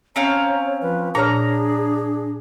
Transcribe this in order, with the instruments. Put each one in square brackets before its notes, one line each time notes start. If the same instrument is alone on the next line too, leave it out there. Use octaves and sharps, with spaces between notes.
[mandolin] C4 C#4 F5 [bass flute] C#5 [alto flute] A#5
[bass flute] F3 [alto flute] B4
[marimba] A#2 C#5 F6 [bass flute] D4 [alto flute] G#4 [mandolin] A#5